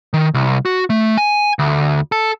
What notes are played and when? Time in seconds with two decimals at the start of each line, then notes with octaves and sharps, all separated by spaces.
0.14 D#3
0.34 C2
0.65 F#4
0.90 A3
1.17 G#5
1.59 D2
2.12 A4